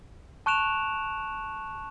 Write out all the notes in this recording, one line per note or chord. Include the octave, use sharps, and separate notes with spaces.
A5 C#6 F#6 D7 E7 F7